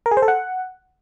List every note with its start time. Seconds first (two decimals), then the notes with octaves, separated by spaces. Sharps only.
0.06 A#4
0.11 G#4
0.17 C5
0.22 A4
0.28 F#5